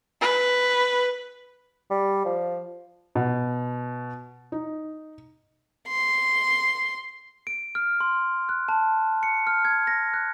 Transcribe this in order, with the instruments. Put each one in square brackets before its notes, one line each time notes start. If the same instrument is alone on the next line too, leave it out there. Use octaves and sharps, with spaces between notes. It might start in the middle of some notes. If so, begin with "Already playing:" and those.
[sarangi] B4
[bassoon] G3
F3
[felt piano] B2
D#4
[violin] C6
[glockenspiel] D7
F6
C6
F#6
A5
C#7
F6
G#6
A#6
F#6